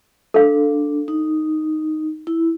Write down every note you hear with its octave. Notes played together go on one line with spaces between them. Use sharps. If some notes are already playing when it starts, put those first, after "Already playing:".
D4 A4 F5
D#4
E4